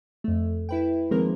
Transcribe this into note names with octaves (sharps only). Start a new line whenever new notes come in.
F2 A3
E4 B4 G5
D#3 F3 G#3 A#3 C4 A#4